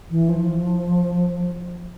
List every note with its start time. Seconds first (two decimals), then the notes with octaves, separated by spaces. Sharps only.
0.10 E3
0.29 F3